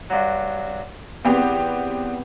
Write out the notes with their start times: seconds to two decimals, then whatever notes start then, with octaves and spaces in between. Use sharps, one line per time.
0.10 G2 F#3
1.25 E2 B3 C4 G4